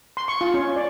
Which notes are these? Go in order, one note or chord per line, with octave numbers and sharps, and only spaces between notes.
C6
C#6
F4
C#4
D5